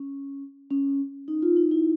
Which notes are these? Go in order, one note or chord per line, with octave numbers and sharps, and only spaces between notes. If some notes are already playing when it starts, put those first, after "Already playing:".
Already playing: C#4
C#4
D#4
F4
D#4
E4